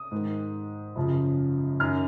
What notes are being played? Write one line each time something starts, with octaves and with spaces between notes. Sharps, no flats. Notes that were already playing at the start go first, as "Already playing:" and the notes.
Already playing: D#6
G#2 D#3
F#2 C#3 F3
F#2 D#3 F6